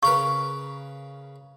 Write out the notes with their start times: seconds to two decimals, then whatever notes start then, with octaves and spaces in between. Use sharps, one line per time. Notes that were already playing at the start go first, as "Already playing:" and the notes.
0.03 C#3 A#4 B4 C#6